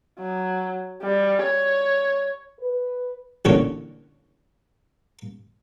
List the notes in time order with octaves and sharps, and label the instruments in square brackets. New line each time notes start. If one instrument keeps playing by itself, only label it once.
[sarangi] F#3
G3
C#5
[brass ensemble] B4
[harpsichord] A1 A#2 D3 D4 C#5